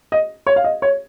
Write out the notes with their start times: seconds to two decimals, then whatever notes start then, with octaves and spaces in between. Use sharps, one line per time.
0.12 D#5
0.47 C#5
0.56 F5
0.64 D#5
0.82 C#5